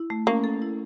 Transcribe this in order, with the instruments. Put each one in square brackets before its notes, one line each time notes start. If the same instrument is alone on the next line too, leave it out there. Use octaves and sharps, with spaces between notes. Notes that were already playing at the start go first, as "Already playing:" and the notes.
Already playing: [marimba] E4
A3
[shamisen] A#3 [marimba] C#4
[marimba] A4
E4